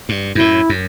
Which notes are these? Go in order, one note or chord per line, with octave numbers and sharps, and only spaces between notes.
G2
F#2 A2 E4
F#2